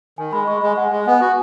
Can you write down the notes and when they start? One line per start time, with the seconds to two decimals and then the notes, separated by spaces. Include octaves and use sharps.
0.18 D#3 G#5
0.32 G#3 B5
0.47 G#3 C#6
0.58 B5
0.63 G#3 G#5
0.77 G#3 F#5
0.92 G#3 G#5
1.07 B3 F#5
1.21 F#4 G#5